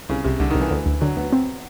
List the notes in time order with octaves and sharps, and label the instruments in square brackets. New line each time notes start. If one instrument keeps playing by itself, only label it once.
[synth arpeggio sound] C2 [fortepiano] C#3
[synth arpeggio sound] C2 [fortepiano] C3
[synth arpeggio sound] C2 [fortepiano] D3
[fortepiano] D#3
[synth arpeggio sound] C2
[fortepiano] E3
[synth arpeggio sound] D2
D2
[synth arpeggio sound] D3 [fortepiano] F#3
[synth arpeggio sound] D2 [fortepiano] B3
[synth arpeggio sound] C4